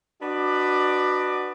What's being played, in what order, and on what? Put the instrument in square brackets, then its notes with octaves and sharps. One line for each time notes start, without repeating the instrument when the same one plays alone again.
[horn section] D4 F#4 B4 D5 D#5